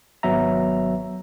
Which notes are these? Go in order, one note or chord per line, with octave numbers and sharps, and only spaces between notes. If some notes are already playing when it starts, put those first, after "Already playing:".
G#1 F#3 B3 E5 A#5